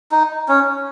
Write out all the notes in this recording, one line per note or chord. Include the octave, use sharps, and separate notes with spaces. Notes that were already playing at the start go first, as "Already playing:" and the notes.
D#4
C#4